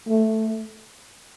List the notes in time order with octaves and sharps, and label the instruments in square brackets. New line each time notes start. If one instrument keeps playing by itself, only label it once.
[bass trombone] A3